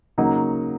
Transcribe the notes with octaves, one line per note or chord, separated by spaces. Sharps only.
C#3 F#3 A#3 D#4